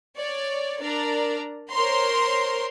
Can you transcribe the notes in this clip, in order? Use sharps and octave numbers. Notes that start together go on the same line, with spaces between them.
C#5 D5
D4 A#4 D5 A#5
A#4 C5 C#5 A#5 C6